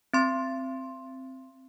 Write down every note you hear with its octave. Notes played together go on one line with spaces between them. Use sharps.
C4 C6